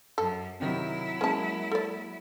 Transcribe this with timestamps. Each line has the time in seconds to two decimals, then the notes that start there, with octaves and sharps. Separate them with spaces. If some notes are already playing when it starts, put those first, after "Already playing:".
0.18 F#2 A4
0.60 C3 D#3 F#3 E4
1.21 G#3 A#3 C#4 A5
1.71 A4 D5